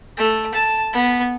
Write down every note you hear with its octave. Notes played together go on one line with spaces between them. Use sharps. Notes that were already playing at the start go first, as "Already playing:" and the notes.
A3
A5
B3